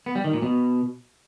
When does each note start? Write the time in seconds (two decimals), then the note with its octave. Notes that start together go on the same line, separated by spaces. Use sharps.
0.06 B3
0.15 G3
0.24 D#3
0.33 A#2
0.42 B2